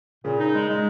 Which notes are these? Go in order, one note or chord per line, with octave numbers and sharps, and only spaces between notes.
A#2 C#3
D#4
G#3
G#3